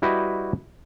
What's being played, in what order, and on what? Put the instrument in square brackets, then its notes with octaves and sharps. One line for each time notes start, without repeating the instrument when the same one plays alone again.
[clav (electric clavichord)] G3 E4 F#4 B4 D#5 G5